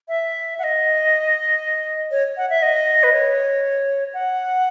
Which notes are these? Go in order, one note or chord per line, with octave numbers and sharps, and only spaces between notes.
E5
F#5
D#5
C#5
F#5
E5
D#5
B4
C#5
F#5